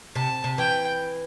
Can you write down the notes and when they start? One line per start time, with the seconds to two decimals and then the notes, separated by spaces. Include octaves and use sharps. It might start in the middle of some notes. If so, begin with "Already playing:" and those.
0.15 C3 A5
0.44 C3
0.58 E3 G5